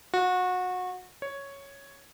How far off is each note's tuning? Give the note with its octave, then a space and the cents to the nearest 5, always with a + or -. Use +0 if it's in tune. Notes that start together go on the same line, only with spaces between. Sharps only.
F#4 -25
C#5 +0